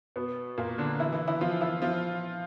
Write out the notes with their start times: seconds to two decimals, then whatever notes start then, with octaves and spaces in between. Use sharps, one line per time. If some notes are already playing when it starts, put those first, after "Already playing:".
0.16 B2 B3
0.58 A#2 A#3
0.78 D3 D4
1.00 E3 E4
1.13 E3 E4
1.28 E3 E4
1.41 F3 F4
1.61 E3 E4
1.82 F3 F4